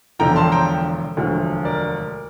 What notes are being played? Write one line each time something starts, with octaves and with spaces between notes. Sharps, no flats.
E1 E2 D3 F3 G5 A#5
A5 C6
G5 A#5
E1 D2 D3 F3
A#4 D5